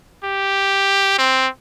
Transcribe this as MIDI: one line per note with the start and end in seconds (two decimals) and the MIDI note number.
0.24 1.18 67
1.18 1.48 60